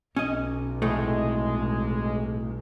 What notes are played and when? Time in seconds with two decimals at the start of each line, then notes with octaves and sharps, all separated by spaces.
0.16 B1 C#4 D#5
0.82 C2 A2 G#3 A3